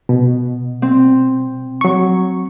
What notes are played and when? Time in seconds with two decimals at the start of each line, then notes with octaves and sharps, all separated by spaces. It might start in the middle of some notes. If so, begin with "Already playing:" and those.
0.09 B2
0.82 C4
1.81 F#3 C#6